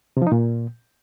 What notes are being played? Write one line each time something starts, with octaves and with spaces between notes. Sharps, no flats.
C3
F3
D#4
A#2